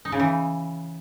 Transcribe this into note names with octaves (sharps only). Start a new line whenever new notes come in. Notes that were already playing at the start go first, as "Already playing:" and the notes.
D#4
C#3
E3